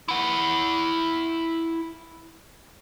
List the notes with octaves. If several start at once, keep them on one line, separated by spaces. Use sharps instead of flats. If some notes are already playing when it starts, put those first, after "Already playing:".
E4 F#5